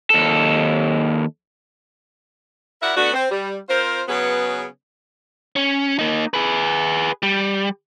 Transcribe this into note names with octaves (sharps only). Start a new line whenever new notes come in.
D#2 A4
E4 F#4 A#4 D5 E5 F#5
A3 B3 D4 F#4
C4
G3
C4 F4 A#4 C5
C#3 F#3 B3 C#4 G#4 B4
C#4
A#3 D#4
G#4 B4
G3